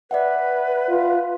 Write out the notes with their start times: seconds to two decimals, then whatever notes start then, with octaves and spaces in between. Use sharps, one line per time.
0.11 B4 D5 E5 F#5
0.89 F4